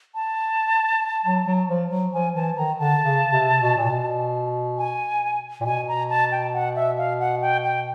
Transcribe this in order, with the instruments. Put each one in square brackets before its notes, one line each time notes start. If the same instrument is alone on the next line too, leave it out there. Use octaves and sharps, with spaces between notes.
[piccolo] A5
[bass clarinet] F#3
F#3
F3
F#3
[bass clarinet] F3 [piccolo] G#5
[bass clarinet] E3 [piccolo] A5
[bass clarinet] D#3 [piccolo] A#5
[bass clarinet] D3 [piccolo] A5
[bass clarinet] C#3
C3
B2
A#2
B2
[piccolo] G#5
[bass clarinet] A#2
[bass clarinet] B2 [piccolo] G#5
[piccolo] A#5
A5
G5
F#5
E5
F5
F#5
G5
G5